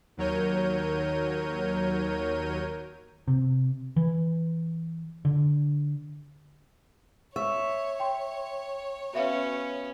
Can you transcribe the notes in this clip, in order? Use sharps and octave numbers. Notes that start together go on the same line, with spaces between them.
D#2 F#3 A#4 C#5 G6 D#7
C3
E3
D3
C#5 E5 C#6
G5 C6
B3 C#4 F#4 E5 F5